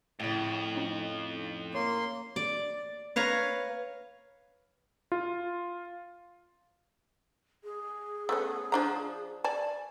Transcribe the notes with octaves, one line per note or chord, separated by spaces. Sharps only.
F2 A2 C#3
F3 C#4 D#4
A#3 C#5 C6
D5
B4 C#5 F5 A#5
F4
G#4
A3 B3 C#4
F3 D4 A#5
D5 G#5 A5